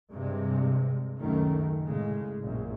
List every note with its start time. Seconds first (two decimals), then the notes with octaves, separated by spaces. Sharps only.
0.12 G2 C3 G#3
1.18 C#2 F#2 D#3 A3
1.84 A2 C#3 G#3
2.42 A#1 F#2